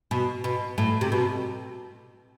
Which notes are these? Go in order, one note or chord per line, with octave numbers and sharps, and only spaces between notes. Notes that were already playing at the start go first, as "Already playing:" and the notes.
B2
B2
A2
C3
B2